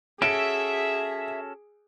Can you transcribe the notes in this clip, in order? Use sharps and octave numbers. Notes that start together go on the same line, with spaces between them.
C#4 F#4 G#4 A4 E5 D7